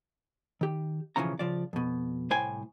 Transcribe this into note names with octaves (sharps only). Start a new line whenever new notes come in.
D#3 G4
B1 C#3 E3 F3 C#4 A#5
C#3 F3 D5
F2 B2
C2 A2 C5 G5 G#5